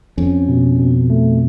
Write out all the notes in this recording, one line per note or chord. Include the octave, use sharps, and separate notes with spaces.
F2 C#4
B2
B2
A3